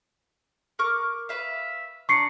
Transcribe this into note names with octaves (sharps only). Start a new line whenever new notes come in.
A#4 C#6 D6
B4 E5 F5
D4 D5 A#5 C#6 C7 C#7